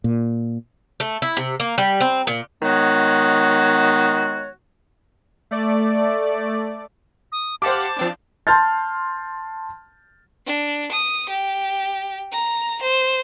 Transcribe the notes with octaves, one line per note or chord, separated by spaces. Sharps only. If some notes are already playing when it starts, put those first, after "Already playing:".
A#2
A3
E4
C3
A#3
G3
C4
A#2
D#3 G#3 B3 F#4 C#5
A3 D5
D#6
G4 C5 F5 F#5 A5 D6
F3 C4 D4
A5 C6 F6 G6 A6
D4
D#6
G4
A#5
C5